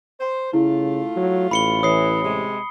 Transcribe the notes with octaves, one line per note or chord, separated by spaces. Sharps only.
C5
C#3 A3 E4 F4
F#3
A1 B5 C#7 G7
E3 C#5 D#6 C7
C3 G#3